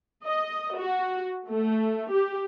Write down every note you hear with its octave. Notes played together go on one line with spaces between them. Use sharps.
D#5
F#4
A3
G4